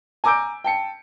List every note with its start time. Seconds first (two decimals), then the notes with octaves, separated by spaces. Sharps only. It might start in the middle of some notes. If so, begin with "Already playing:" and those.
0.24 G#5 A#5 D6 E6 G6 D7
0.64 G5 A5 C#7